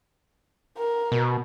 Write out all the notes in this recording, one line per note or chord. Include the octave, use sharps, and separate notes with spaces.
A#4
B2